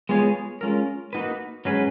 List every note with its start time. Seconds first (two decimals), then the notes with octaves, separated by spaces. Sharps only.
0.09 G#3 B3 F4 G#4 C#5
0.61 G#3 C#4 F4 A#4
1.13 A#3 D#4 F#4 B4
1.65 G#2 F#3 C#4 G#4 B4